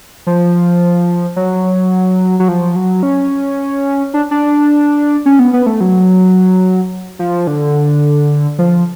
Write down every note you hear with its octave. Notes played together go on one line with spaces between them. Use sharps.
F3
F#3
F#3
F3
F#3
C#4
D4
D4
C#4
B3
B3
A3
F#3
F3
D3
F3